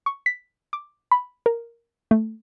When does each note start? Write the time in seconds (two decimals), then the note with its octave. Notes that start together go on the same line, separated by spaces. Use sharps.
0.06 C#6
0.26 B6
0.73 D6
1.12 B5
1.46 A#4
2.11 A3